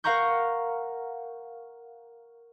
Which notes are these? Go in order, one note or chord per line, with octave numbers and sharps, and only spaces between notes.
A#4 F5 F#5 A#5 C#6 G6